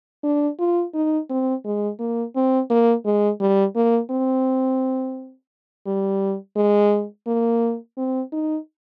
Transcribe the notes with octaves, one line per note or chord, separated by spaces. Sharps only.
D4
F4
D#4
C4
G#3
A#3
C4
A#3
G#3
G3
A#3
C4
G3
G#3
A#3
C4
D#4